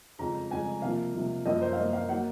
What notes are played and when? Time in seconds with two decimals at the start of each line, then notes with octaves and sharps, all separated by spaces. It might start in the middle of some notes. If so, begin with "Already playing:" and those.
0.19 F2 C#3 G#3 A#5
0.51 F2 C#3 G#3 G#5
0.82 C3 F3 A#3 F5
1.14 C3 F3 A#3
1.45 F#2 F3 A#3 D#5
1.62 C5
1.73 F5
1.77 F#2 F3 A#3 D#5
1.93 F5
2.09 F#3 A#3 F#5